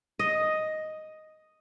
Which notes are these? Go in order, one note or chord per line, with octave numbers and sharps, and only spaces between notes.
D#5